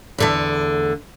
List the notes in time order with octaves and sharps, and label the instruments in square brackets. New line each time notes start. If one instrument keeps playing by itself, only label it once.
[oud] E2 D3 A3